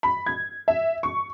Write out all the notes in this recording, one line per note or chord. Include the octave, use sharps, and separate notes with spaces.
B5
G#6
E5
C#6